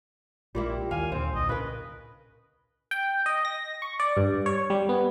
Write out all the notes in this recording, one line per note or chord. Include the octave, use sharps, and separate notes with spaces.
A#1 G3 G#3 A#3 E4 F4
D#2 F5 G#5
D#2 A#2 D3 C4 C5
C2 D#5
A#2 C#3 A#4 B4
G5
D#5
A#6
C#6
D5
G2
C#5
G3
B3